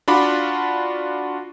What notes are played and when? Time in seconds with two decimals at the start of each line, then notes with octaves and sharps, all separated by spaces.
0.08 D4 F4 F#4 B5 D6